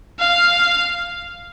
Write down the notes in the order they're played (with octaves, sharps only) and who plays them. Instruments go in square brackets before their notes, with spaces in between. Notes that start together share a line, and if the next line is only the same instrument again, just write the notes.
[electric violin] F5